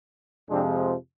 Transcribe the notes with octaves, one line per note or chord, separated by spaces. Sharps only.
F2 C3 F3 G#3 C4 D4